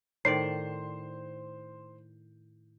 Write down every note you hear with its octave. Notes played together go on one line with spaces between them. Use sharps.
A2 D#3 C5 D5 C7